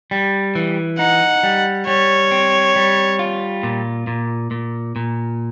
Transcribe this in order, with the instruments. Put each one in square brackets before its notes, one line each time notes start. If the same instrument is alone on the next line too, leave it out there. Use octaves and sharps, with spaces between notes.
[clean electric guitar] G3
E3
[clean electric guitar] D#4 [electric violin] F#5
[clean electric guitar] G3
[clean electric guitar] G3 [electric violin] C#5
[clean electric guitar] C4
G3
F4
A#2
A#2
A#2
A#2